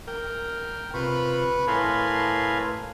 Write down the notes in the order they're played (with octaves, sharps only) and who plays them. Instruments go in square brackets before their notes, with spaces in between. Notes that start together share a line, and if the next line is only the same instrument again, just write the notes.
[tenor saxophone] A#4 [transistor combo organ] G5
[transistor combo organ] C3 F4 [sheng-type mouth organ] B4 B5 C#6
[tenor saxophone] A2 [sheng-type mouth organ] A#4 A5 C6 [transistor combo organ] B4 F5 G#5